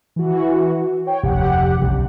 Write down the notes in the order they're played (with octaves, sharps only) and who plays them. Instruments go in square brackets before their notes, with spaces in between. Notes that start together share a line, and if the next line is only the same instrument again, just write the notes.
[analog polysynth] E3 F#4
C#5 G5
[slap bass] F1 D2 [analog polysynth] G4 F#5
[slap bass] B1 C#3